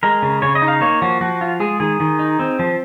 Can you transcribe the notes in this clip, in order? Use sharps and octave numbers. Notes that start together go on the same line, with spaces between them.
G#3 A#4
C#3
C#3 C#5
D#5
D#4
F5
A#3 C#5
F3 F#4
F3 F#4
F4
G#3 G#4
D#3 G#4
D#3
D#4
C4
F3